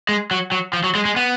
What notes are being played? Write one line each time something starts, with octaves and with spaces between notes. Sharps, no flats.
G#3
F#3
F#3
F3
F#3
G#3
G#3
B3